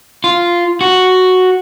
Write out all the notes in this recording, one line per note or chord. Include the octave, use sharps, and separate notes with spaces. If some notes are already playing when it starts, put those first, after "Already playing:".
F4
F#4